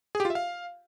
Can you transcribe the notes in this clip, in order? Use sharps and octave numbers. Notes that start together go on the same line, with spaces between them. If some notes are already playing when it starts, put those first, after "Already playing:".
G#4
G4
F4
E5
F5